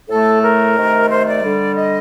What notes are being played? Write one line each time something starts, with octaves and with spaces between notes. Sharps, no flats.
A2 A3 A4
A#4
C3 D#3 A3
C5
D5
D3 G3
D#5